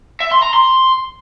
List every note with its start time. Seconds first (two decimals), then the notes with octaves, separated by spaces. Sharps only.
0.20 E5
0.31 C6
0.43 A#5
0.54 C6